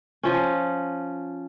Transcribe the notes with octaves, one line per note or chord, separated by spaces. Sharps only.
F3 C#4